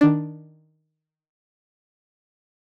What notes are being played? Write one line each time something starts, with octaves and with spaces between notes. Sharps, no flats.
D#3 D4